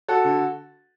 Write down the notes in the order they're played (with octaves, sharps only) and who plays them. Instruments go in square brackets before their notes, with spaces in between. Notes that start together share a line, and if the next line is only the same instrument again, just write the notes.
[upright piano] F#4 A4
D3